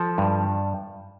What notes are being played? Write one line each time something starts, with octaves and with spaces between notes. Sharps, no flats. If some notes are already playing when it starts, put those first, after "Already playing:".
Already playing: F3 A4
G2